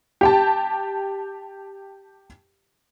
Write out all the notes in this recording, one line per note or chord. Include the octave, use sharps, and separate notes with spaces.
G4 G5 A5